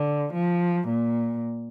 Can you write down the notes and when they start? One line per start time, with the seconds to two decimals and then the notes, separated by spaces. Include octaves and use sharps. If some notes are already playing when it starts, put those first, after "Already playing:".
Already playing: D3
0.33 F3
0.88 A#2